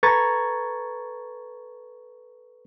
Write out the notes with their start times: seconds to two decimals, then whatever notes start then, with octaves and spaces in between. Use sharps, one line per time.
0.03 A4 B4 A#5 C#6 G#6 A6